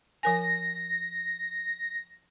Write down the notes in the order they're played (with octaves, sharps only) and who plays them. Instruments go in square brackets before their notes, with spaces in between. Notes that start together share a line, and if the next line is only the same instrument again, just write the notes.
[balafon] F3 A#4 G#5 [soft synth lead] A#6